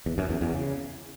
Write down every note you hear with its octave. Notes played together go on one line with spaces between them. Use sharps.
E2
F#2
E2
E2
C#3